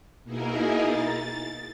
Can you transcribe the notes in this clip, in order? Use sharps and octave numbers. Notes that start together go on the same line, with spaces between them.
B2 A#3 D#4 E4 G#4 A#4
A6